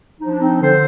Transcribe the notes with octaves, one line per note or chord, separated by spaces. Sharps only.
F3 D#4
D4
C4 D#4
D3 A4 C5